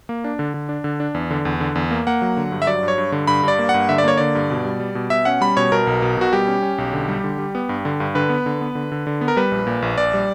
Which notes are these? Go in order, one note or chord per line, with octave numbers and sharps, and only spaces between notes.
A#3
D4
D3
D3
D4
D3
D4
E2
D3
E2
D3
E2
A#3
A#3 F#5
F#3
D3
G2
E5
F#3 D5
G2
C#5
G2
D3
G2 B5
G2 D5
A#3
F#5
G2
D3 E5
D5
A#3 C#5
D3 D5
G2
B2
G3
G3
B2
B2 E5
C#4 F#5
G3 B5
B2 C#5
B2 A#4
B1
B2
B2 F#4
G3 G4
C#4
C#4
B1
D3
G3
D3
G3
B3
G2
D3
G2
D3 B4
B3
D3
B3
D3
D3
D3
B3
A#4
G3 B4
A#1
A#2
A#1
A#1 D5
G3